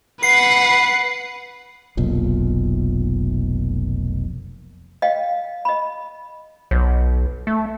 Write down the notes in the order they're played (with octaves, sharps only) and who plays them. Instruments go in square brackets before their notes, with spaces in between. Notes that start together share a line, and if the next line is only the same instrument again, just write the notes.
[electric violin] B4 F#5 [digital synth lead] C7
[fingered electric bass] F1 B1 A#2
[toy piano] D#5 F5 G5
D#5 B5
[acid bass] B1 [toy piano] C#5
[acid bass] A3